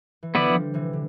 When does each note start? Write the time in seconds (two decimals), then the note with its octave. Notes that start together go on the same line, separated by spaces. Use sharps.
0.23 E3
0.34 D3 F3 B3 E4 B4 D5
0.49 E3 F3 G3
0.74 C3 E3
0.93 D3